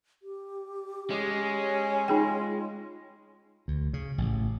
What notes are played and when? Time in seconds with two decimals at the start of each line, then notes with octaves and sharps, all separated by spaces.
0.23 G4
1.10 G#3 C#4
2.08 D#4 F4 G#4 G5
3.68 D2
3.93 C#3
4.18 A1